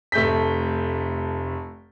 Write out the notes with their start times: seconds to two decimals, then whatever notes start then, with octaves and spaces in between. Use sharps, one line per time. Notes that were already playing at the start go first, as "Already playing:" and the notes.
0.12 F1 A3 G6 B6